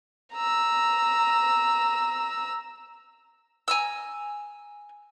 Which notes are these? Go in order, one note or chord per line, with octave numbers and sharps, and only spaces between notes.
A#5 E6
G#5 A#5 E6